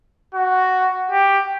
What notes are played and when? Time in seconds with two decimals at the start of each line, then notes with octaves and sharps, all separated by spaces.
0.34 F#4
1.11 G4